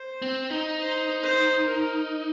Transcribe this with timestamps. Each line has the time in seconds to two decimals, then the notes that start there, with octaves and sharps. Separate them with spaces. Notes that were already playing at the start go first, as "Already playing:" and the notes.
Already playing: C5
0.22 C4
0.50 D#4
0.80 C5
1.23 C5
1.66 A#4